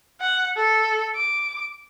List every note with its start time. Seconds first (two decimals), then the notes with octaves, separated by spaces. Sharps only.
0.21 F#5
0.57 A4
1.16 D6